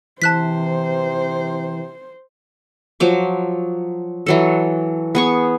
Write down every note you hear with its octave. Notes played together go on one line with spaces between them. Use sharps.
C3 E3 C5 A5 F#6 B6
F3 F#3 D6
E3 F#3 A4
B3 G#4 C#6